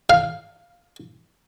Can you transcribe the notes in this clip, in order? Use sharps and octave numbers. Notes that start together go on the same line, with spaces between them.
F5